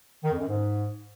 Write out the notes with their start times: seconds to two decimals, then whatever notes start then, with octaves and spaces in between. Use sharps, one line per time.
0.24 D#3
0.32 F2
0.39 F#2
0.47 G#2